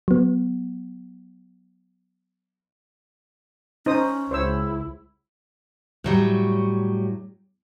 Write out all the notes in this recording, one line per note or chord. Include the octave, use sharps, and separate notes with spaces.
F#3 B3
C#4 D#4 C5 D#6
C#2 E4 C5 C#5 E6
A2 F#3 G3